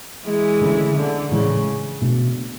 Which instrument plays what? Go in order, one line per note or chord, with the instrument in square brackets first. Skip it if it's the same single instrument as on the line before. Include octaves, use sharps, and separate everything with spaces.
[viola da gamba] E3 G#3
[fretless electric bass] D3 A3 C#4
[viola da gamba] D3
[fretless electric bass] A2 E3 G#3 [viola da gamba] C#3
[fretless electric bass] B2 A3 D4